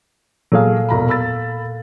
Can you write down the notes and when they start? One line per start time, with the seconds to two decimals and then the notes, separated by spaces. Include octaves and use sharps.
0.52 A#2 F#3 G#4 A4 F5
0.89 E1 A#5 B5
1.09 B5 E6 A6